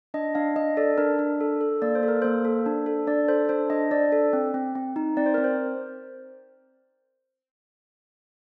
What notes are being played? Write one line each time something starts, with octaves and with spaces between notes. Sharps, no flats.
D4 D#5
D4 F5
D4 D#5
A4 D5
D4 A#4
D4
A4
A4
A#3 D5
C5
A4
A#4
A#3 C5
A4
D4
A4
D4 D5
A4 C5
D4 C5
D4 D#5
D4 D5
A4
C4
C4
C4
D#4
C4 D5
C5
C4 A#4
C5